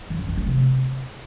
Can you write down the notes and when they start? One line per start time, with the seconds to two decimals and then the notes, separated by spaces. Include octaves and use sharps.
0.10 E3
0.19 F#2
0.28 D#3
0.37 A3
0.46 C3